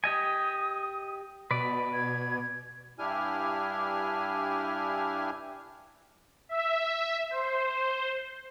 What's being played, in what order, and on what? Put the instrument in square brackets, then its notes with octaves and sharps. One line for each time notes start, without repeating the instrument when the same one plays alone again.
[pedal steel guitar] G4 D#5 G#5 [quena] D#6
[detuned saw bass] B2 [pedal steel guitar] B4 D5 [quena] D#5
[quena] G#6
[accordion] G2 D4 E4 G4 G#5 F6
[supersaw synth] E5
C5